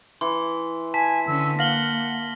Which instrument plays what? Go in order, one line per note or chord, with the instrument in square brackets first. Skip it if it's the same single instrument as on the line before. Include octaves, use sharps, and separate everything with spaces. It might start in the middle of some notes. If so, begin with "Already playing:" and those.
[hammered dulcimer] E3 [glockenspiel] C6
[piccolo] G#5 [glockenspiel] A5 B6
[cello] D3 C#4 [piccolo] E6
[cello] A#3 [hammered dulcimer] F5 [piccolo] F#5 [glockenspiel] A#6 F#7 G7